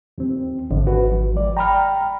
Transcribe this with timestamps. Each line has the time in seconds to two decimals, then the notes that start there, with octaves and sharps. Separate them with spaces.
0.18 D#2 D#3 C4
0.71 G#1 D3
0.87 D#3 F#4 B4
1.09 D#3 F3
1.35 G#3 D5
1.57 G5 A#5 B5 F6